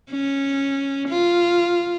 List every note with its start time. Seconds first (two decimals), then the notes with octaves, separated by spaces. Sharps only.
0.11 C#4
1.08 F4